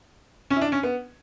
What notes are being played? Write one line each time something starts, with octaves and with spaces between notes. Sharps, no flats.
C#4
E4
D4
C#4
B3